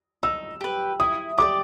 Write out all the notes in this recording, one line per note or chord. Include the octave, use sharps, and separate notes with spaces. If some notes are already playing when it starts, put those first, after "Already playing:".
D#4 E6
G4 B4
E4 D#6
G4 A#4 D5 D6